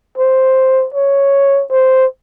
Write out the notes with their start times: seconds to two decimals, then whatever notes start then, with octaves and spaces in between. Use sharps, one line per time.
0.17 C5
0.94 C#5
1.71 C5